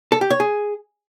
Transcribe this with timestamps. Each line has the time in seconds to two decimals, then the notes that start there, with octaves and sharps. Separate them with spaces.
0.12 A4
0.21 G4
0.30 C#5
0.40 G#4